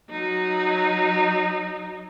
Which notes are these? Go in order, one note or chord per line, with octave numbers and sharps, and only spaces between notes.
F#3 D#4